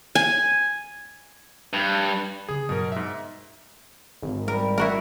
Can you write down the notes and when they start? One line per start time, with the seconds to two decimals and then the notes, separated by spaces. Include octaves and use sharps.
0.15 G#5
1.73 G2
2.48 C#3 G#4
2.69 G2 B2 F#3 A#4
2.92 G#2 E5
4.22 G#1
4.48 G3 A#4
4.78 E4 F#4 A#4